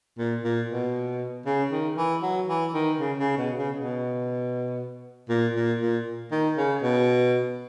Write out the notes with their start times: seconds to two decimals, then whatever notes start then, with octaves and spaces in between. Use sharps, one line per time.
0.19 A#2
0.44 A#2
0.69 B2
1.46 C#3
1.72 D#3
1.97 E3
2.22 F#3
2.48 E3
2.74 D#3
2.99 C#3
3.19 C#3
3.37 B2
3.57 C#3
3.76 B2
5.29 A#2
5.56 A#2
5.81 A#2
6.32 D#3
6.57 C#3
6.83 B2